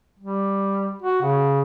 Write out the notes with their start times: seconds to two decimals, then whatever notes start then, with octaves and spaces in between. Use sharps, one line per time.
0.19 G3
1.02 F#4
1.22 C#3